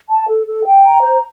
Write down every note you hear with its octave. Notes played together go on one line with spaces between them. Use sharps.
A5
A4
A4
G5
A#5
C5